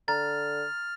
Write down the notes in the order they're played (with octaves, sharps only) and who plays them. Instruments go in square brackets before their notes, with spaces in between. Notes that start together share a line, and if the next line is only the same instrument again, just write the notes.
[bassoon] D3 [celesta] A#5 [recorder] F6 [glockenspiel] A6